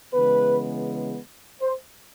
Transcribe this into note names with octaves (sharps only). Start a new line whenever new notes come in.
C#3 E3 G#3 B3 B4
C5